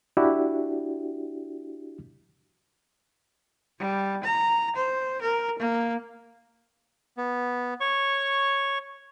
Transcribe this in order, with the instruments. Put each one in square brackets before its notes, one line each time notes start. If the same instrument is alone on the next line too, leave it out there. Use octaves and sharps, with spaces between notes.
[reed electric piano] D4 E4 F#4 G4
[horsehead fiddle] G3
A#5
C5
A#4
A#3
[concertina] B3
C#5 C#6